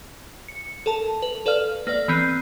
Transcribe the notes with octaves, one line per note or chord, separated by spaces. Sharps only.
C#7
A4 A#4 A5
B4
A4 B4 D5 F5 F6
A#3 B4 D5
E3 B3 C4 C7 D#7